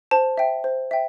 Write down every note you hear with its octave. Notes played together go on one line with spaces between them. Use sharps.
C5 A5
E5 G5
C5
E5 G5